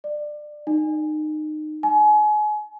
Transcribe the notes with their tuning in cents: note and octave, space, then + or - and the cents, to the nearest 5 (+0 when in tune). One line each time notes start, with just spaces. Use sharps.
D5 +25
D#4 -25
G#5 +30